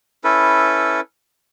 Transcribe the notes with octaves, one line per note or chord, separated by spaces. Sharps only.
C#4 E4 A4 B4